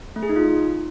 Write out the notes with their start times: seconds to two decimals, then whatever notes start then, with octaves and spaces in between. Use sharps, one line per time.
0.16 A3
0.23 G#4
0.29 D#4
0.36 F4